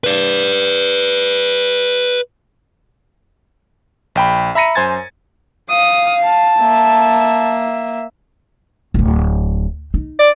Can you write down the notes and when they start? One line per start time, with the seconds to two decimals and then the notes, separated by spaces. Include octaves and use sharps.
0.04 B4 D5
4.15 A#1 G5 B5
4.55 E5 A#5 B5 A#6 C#7 D#7
4.75 F#2 C5 G#5 G#6 A6
5.70 F5 D#6
6.24 A5
6.59 A#3 E5
8.94 D1 G1
9.94 D#4
10.19 D5